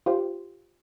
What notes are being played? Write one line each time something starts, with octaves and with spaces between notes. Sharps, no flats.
F4 G4 C5